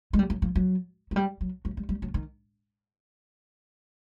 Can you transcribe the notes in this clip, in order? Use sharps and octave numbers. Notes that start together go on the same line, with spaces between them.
G#3
G3
F#3
F3
F#3
F#3
G3
F#3
F#3
G3
G3
F#3
D#3